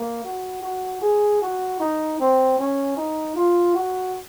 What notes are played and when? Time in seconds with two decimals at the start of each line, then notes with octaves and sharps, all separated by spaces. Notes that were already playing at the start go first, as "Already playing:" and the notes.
Already playing: A#3
0.24 F#4
0.63 F#4
1.02 G#4
1.42 F#4
1.80 D#4
2.20 C4
2.59 C#4
2.97 D#4
3.36 F4
3.75 F#4